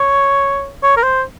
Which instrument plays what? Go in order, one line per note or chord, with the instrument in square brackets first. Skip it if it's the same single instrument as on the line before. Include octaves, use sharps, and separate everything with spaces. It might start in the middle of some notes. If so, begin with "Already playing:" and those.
Already playing: [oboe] C#5
C#5
A#4
C5